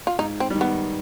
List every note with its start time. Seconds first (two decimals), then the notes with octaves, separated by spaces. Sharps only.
0.07 F4
0.19 G#2 D#4
0.40 C4
0.50 D#3 G3
0.61 B3